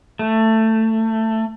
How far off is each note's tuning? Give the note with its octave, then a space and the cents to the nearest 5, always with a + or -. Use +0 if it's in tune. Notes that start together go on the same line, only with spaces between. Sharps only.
A3 +15